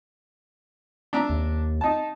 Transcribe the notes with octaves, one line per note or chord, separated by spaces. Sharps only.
D4 E5 A#5
D#2
D#4 A5